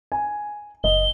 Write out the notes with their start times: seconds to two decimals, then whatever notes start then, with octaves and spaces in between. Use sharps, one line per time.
0.12 G#5
0.84 F#1 D#5 G7